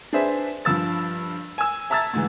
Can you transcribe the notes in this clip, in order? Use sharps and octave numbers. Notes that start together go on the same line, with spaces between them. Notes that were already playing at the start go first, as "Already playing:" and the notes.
D4 G#4 B4 C5 E5
G2 F3 E6 A6
G#5 E6
E5 A5 A#5 E6 G#6 A6
D2 G#2 E3